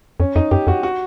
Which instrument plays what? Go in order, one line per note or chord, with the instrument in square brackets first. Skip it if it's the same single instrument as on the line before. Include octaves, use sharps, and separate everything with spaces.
[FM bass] F2 [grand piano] C#4
[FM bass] F2 [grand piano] D#4
[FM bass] F#2 [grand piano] G4
[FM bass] F2 [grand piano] F#4
[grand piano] F#4